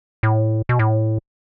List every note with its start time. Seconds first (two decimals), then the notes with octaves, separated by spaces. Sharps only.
0.23 A2
0.69 B2
0.79 A2